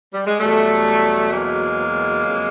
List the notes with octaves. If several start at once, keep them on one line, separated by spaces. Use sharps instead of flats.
G3
G#3
E2 B2 F#3 G3 A3
G#3 A#3
F2 C#3 F#3